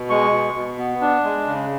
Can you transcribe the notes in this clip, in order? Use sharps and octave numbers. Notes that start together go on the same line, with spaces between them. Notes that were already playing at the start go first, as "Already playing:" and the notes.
Already playing: B2
G#3 C#6
B2
B2
B3
D4
G#3
C#3